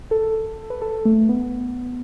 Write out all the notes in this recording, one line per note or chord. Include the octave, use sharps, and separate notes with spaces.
A4
B4
A4
A3
B3